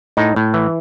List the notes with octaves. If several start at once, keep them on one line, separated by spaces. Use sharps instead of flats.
A2 D#4
A2
E3